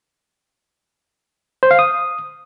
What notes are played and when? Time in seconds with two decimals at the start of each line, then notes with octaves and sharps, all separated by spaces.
1.63 C5
1.71 F5
1.79 D#6